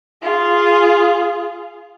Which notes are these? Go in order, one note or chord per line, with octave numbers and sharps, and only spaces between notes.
F4 G#4